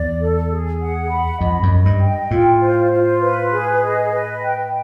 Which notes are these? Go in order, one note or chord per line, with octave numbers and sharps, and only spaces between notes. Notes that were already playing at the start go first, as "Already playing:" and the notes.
Already playing: E2 D5
A4
G#4
F#5
B5
F2 D#5
F#2
D#5
G2
G5
A2 F4
C5
F4
B4
G#4
D#5
B4
G5